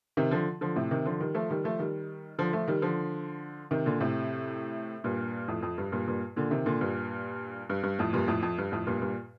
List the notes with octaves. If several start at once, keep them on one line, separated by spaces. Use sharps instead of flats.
C3 D#3
D3 F3
D3 F3
A2 C3
C3 D#3
D3 F3
D#3 G3
F3 A3
D#3 G3
F3 A3
D#3 G3
D3 F3
F3 A3
D#3 G3
D3 F3
C3 D#3
A#2 D3
A2 C3
G2 A#2
F2 A2
F2
G2
G2 A#2
G2 A#2
A#2 D3
C3 D#3
A#2 D3
G2 A#2
G2
G2
F2 A2
G2 A#2
F2 A2
F2
G2
F2 A2
G2 A#2
G2 A#2